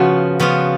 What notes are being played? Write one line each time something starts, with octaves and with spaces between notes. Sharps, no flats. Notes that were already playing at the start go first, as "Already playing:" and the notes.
Already playing: C#3 F3 B3 F4 F#4
C#3 F3 B3 F4